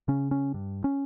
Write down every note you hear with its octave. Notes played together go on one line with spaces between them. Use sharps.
C#3 C#4
C#4
G2
C#4